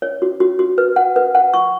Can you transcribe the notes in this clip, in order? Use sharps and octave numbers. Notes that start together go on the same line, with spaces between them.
C#5
F#4
F#4
F#4
B4
F#5
B4
F#5
C#6